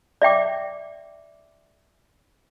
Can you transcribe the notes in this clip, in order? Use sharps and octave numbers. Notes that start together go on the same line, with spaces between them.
D5 E5 G5 D6